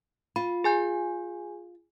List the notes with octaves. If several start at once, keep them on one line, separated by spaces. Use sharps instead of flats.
F4 B5
G#4 G#5 G6